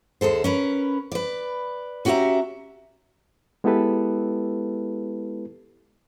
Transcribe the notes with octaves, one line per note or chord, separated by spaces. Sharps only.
D#2 G#4 A4 C5
C#4 A#4 B4
B4 D5
C#4 F#4 G4 C#5 E5 A#5
G#3 B3 E4 G4 A4 B4